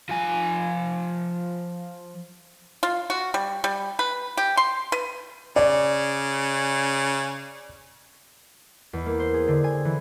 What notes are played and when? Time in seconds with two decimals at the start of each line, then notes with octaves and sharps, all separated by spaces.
0.09 F3 G#5
2.83 F4
3.10 F#4
3.34 G3
3.64 G3
3.99 B4
4.37 G4
4.57 C6
4.92 B4
5.56 C#3 D5
8.93 E2
9.06 A#3
9.19 C5
9.34 G#4
9.48 D3
9.64 G#5
9.85 E3